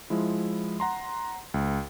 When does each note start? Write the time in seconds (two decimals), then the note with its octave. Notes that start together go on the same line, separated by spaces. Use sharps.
0.10 F3 G#3 E4
0.80 F#5 A#5 C6
1.54 C#2